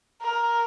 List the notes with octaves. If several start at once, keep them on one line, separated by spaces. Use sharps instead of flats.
A#4